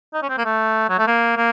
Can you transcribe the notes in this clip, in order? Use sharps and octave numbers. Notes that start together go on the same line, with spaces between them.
D#4
C#4
C4
A#3
A3
F#3
A3
A#3
A#3